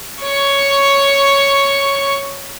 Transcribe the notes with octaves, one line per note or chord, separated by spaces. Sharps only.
C#5 C#6